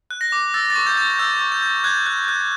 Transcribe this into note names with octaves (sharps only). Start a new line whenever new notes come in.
F#6
A#6
D6
E6 A6
A6
C#6
G6
G6
E6 G6
C#6
G6
G6
F#6 G#6
F#6
F#6